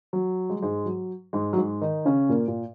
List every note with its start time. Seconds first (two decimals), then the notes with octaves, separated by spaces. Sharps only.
0.13 F#3
0.50 G#3
0.56 F#3
0.62 G#2 G#3
0.85 F#3
1.33 G#2 G#3
1.53 F#3
1.57 G#2 G#3
1.81 D#3 D#4
2.05 C#3 C#4
2.29 A#2 A#3
2.47 A#2 A#3